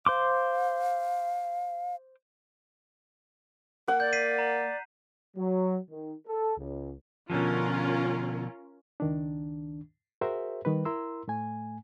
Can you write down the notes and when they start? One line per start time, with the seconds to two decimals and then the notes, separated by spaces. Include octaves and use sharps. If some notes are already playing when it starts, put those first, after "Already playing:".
0.06 C5 F5 C6 D6
3.88 A#3 F#5
4.00 D5 G6
4.13 B6 C7 D#7
4.38 A#5
5.37 F#3
5.90 D#3
6.27 A4
6.58 C#2
7.30 B2 D3 F3 C#4 F4 A#4
9.00 C#2 D#3 D4
10.21 F#4 G#4 A#4 C5 E5
10.65 D#3 G3 B4
10.85 E4 A#4 A#5 C6 E6
11.28 A2 A3 G#5